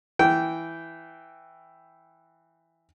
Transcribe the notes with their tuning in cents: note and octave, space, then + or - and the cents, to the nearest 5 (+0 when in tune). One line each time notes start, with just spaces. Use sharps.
E3 +0 G5 -15